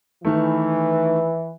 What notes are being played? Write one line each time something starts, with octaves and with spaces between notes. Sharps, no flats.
D#3 E3 A3